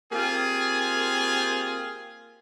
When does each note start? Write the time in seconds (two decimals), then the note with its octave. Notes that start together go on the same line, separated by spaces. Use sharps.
0.12 A#3 C4 F4 G4 G#4